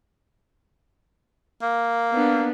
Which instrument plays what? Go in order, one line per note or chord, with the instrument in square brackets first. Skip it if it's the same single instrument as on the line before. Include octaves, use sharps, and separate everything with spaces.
[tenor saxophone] A#3
[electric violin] B3 D4